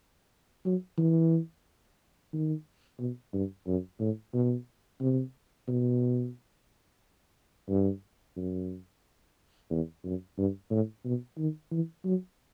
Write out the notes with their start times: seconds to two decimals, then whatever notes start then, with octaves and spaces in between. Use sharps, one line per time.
0.65 F#3
0.98 E3
2.33 D#3
2.99 B2
3.33 G2
3.67 F#2
4.00 A2
4.34 B2
5.01 C3
5.68 B2
7.69 G2
8.37 F#2
9.70 E2
10.04 F#2
10.38 G2
10.71 A2
11.05 B2
11.38 D#3
11.71 E3
12.05 F#3